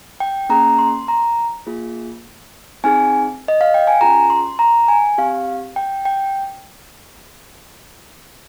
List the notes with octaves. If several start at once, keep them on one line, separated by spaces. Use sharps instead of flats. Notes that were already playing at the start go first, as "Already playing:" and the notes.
G5
A#3 C#4 G#4 A#5
C6
A#5
A#3 F4 G#4
C4 D#4 G#4 G#5
D#5
F5
G5
G#5
C#4 F4 G#4 A#5
C6
A#5
G#5
C4 G4 F5
G5
G5